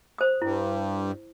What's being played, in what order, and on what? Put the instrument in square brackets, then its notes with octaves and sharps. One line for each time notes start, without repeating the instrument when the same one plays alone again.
[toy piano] C5 D#6
[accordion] G2 [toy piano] E4